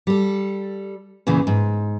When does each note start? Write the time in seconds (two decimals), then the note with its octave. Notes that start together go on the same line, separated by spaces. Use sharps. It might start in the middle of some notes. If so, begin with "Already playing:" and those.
0.07 G3 A4
1.27 E2 A#2 C#3 E3
1.47 G#2